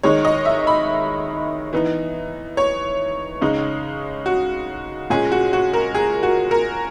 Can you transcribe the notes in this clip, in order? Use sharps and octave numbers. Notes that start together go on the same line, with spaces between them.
D#3 G#3 D#4 C#5
D#5
E5
B5
E3 B3 D#4
C#5
C#3 G#3 D#4
F#4
A#2 G#3 C#4 G#4
F#4
F#4
A#4
G#4
F#4
A#4